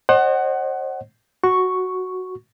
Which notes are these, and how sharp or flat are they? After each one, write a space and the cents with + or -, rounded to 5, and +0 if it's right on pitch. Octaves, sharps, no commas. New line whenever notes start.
C5 +35 D#5 -35 F#5 +20
F#4 +0 C#6 +0